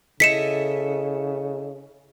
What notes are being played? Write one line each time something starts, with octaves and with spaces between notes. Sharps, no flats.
C#3 E4 A4 D#5 B6 C#7 E7